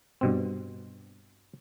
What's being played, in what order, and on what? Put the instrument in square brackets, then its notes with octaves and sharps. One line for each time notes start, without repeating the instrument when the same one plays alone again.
[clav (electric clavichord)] G2 B2 C4